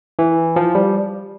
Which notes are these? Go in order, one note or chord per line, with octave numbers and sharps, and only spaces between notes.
E3
F3
G3